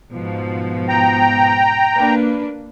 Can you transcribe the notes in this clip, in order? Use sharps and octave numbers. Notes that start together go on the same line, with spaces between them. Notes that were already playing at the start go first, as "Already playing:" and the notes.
G#2 B2 F3
G5 A#5
A#3 D4 B4